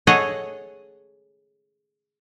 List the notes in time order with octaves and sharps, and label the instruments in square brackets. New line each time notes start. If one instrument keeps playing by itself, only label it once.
[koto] G#4 A4 C#5 D#5 F#5